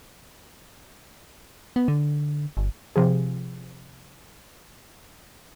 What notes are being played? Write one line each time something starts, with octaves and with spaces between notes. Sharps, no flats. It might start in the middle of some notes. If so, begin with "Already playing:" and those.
B3
D3
G1
C3 F3 G#4